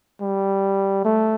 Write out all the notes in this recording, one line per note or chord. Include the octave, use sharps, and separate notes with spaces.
G3
A3